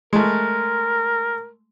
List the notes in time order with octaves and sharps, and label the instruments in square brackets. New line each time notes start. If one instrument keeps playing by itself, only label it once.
[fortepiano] G#3 A3 [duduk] A#4